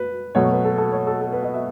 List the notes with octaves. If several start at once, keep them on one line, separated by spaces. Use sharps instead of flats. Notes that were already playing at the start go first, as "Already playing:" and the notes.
Already playing: B4
B2 F#3 A3 C#5
B4
A4
A4
C#5
A4
A4
B4
D#5
E5